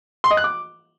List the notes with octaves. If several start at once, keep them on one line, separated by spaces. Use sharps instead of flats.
C6
D#5
F#6
D6